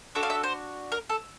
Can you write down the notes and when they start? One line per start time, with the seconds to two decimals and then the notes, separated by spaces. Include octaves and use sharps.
0.15 D4 F#4 A4 E5
0.23 F5
0.30 E5
0.43 C5
0.92 A#4
1.09 A4